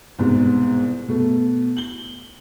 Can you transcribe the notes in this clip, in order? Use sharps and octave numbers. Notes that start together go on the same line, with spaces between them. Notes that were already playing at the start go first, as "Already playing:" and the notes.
C2 G#2 B2
B2 A3
F#7 G7